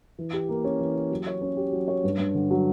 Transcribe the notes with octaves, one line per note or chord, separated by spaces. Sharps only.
E3
G4
A#3
C#4
E3
G4
F#3
C#5
C#4
G4
F#3
C#5
G2
G2
D3
F#3